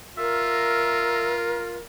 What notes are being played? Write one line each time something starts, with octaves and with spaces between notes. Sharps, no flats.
F4 A#4 E5